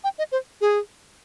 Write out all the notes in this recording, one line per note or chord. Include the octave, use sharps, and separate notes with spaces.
G5
D#5
C5
G#4